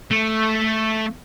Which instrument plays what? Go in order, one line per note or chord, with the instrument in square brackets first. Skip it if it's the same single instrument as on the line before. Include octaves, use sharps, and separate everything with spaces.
[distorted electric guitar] A3